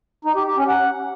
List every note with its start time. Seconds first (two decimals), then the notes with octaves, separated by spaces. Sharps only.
0.25 D#4
0.36 G4
0.46 G4
0.57 C#4
0.68 F#5